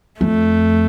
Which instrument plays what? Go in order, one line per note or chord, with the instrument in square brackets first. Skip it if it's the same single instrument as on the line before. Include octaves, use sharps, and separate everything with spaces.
[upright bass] F2 [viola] A3